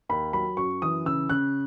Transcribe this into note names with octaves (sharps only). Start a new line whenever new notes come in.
D#2 B5
F#3 B5
F#2 C#6
E3 D#6
C#3 E6
C#3 F#6